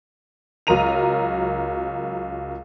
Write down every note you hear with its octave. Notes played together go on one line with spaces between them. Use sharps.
C#2 F#3 A#4 A#5 D#7 F7